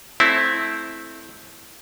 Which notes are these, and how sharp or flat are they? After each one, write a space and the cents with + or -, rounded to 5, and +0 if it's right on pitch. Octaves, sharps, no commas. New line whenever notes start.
A3 -20 C4 +0 E4 -5